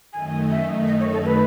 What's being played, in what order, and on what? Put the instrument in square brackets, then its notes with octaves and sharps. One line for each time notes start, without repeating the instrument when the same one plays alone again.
[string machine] F#2 D#3 A3 D#4 [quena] G#5
[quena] E5
D#5
C#5
A4
B4